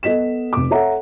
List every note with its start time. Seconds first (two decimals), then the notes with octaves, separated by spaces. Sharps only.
0.03 B3 A4 D#5 B6 E7
0.53 F1 D6
0.71 A4 C#5 E5 F#5 A#5